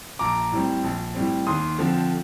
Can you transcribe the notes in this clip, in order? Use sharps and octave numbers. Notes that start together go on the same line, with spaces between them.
A#1 A#5 D6
A2 G3 C4
A#1
A2 G3 C4
D#2 C6 D#6
D3 F3 C4